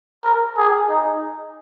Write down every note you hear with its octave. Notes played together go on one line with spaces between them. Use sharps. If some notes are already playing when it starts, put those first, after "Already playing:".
A#4
G#4
D#4